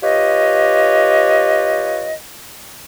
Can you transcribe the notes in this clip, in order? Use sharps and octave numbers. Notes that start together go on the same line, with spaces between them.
F4 G4 B4 C#5 D#5